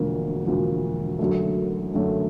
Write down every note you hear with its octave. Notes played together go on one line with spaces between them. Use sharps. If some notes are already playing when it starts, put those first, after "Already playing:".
Already playing: E1 D2 D3 F3 A#3
E1 D2 D3 F3 A#3
F#1 F#2 D3 F#3 A3
F#1 F#2 D3 F#3 A3